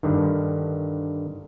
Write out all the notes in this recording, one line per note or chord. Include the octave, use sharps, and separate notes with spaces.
G2 D3 D#3